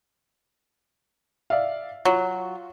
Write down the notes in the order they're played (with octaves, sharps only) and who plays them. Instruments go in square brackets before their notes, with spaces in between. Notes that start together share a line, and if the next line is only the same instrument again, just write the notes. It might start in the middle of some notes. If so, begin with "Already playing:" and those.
[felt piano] D5 E5 F5
[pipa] F#3 [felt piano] F4 F#4